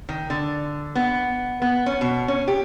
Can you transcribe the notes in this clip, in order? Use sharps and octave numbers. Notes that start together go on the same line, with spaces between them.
D#3
D3
B3
B3
C#4
B2
C#4
G4